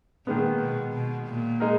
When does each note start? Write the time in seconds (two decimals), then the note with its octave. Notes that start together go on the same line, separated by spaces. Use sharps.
0.27 A#2 D#3 G#3 B3
0.60 B2
0.93 B2
1.27 A#2
1.60 G#3 D#4 A#4